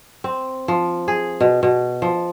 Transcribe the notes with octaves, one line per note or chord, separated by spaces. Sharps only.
C4
F3
G#4
B2
B2
F3